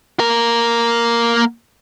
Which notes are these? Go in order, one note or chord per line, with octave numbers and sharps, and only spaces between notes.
A#3 A#4